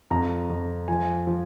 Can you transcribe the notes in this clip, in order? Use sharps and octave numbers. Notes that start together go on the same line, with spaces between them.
F2 A#5
F2
F3 G#5
F3